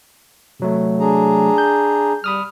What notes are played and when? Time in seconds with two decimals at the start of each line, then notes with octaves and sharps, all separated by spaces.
0.60 C3 F#3 A3
0.99 D4 G#4 A#5
1.58 G6
2.24 G3 B5 D#6 F6